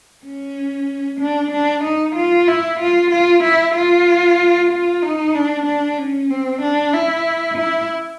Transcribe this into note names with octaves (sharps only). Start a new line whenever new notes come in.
C#4
D4
D4
D#4
F4
E4
F4
F4
E4
F4
F4
D#4
D4
D4
C#4
C4
D4
E4
E4